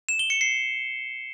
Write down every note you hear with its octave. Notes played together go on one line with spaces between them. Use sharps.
E7
G7
C#7
C7